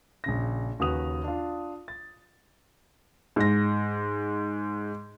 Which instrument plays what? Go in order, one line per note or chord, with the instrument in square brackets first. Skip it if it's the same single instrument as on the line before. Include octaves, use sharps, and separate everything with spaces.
[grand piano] A#1 C#3 A#6
D#2 C#3 F#4 B4 D#6 F7
D4 F4
A6
[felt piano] G#2 A#6